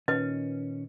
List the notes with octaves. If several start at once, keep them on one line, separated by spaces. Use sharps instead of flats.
A#2 D#3 C#4 B4 D#5